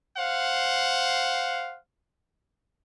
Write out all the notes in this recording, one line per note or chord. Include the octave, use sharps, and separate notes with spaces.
C5 F5 F#5